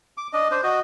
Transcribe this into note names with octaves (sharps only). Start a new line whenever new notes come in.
D6
D4 D#5
D4 C5
F#4 D#5